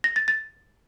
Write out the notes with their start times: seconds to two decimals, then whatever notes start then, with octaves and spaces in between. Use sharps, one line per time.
0.04 A#6
0.16 A6
0.28 A6